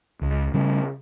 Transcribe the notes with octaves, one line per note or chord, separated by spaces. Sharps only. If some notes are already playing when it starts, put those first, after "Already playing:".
C#2
C#3 G3